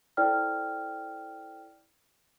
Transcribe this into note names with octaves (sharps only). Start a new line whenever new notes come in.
E4 A4 C5 D5 G5 F6